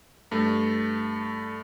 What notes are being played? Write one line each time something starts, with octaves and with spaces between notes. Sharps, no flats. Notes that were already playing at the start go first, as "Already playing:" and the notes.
G2 A3